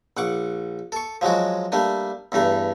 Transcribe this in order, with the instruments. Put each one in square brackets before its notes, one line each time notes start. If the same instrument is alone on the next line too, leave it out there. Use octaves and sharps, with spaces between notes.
[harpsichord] A#1 F#5 C#6 D6
A4 C#6
F3 F#3 G#3 F#4
G3 A3 A#3 D4
E2 G2 A3 A#5